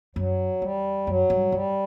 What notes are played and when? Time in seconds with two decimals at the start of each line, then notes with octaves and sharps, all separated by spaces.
0.16 F#2 F#3
0.62 E2 G3
1.07 F#2 F#3
1.30 G2
1.52 F#2 G3